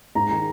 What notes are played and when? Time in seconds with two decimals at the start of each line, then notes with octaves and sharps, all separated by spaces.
0.15 G#2 A#5
0.31 D#3 G#3